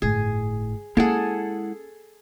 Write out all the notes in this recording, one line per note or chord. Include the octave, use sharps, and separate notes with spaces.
G1 A2 G#4
G#3 A#3 C#4 E4 G#4 A4 F#5